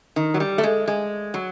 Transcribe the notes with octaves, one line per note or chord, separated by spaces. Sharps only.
D#3
F#3
G3
A3
G#3
G#3
F#3